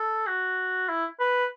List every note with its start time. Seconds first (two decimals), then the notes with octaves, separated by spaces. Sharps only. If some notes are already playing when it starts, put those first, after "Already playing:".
Already playing: A4
0.27 F#4
0.89 E4
1.20 B4